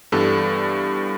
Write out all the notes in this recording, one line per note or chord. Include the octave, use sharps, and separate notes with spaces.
G2 E3 G3 B3 A4